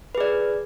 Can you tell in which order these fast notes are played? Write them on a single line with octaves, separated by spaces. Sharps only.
B4 G#4 D5